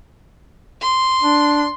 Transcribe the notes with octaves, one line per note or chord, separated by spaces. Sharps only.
C6
D4